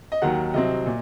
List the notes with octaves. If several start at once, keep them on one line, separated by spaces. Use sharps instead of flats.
D#5
D#2 D#3 F#3 F#5
C2 C3 F#3 C4 D#5
A#2